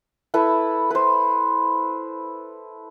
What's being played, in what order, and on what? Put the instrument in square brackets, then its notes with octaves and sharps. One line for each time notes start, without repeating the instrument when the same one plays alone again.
[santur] E4 A4 B4
B4 C5